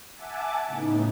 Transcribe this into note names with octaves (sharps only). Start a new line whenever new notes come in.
E5 F#5 G#5 A5 D6
A2 C#3 B3 D#4